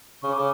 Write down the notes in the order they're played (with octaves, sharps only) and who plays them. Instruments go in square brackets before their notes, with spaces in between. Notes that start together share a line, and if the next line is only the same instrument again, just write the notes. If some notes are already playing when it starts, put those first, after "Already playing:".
[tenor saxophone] C#3 [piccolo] C#6
[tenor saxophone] C#3 [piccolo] D6